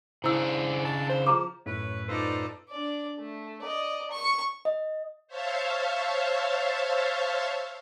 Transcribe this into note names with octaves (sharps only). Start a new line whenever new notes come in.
C#3 D4 E4 C5 E6
A5
C5
F3 G#4 A#5 D6
F#2 A2 B4 C#5
D#4 F4 A4 B4 C5 D5
D4 D5
A3
D5 D#5
C#6
D#5
C5 C#5 E5 F5 A5